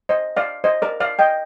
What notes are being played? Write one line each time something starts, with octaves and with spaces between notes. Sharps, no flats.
C5 D#5
D5 F5
C5 D#5
A#4 D5
D5 F5
D#5 G5